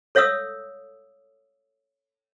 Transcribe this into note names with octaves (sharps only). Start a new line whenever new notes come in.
A4 C#5 E5 F5 D#6 E6